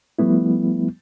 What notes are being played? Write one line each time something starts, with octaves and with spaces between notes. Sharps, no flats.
F3 G3 A3 B3 E4